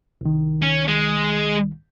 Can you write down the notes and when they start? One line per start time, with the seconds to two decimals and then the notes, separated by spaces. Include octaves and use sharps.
0.21 C2 D#3
0.62 C#4
0.88 G#3